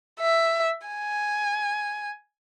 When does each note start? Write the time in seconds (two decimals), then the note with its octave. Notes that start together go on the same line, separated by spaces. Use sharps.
0.20 E5
0.87 G#5